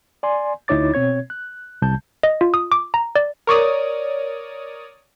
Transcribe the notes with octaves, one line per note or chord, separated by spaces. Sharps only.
D5 G#5 C6
D2 D#4 E4 C#5 D6 A6
B2 C4 C#5 G#6
F#6
C2 C3 G3 A5 G6
D#5
F4
D#6
D6
A#5
D5
A#4 C#5 D5 D#6